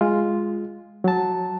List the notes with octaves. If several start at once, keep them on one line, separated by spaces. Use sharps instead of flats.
G#3 F4
F#3 A5